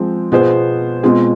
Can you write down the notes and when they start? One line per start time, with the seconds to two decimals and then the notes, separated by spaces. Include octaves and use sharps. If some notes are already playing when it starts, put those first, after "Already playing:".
Already playing: F3 G#3 C4
0.32 B2 B3 F4 G#4 C5
1.03 B2 G#3 C4 F4 G#4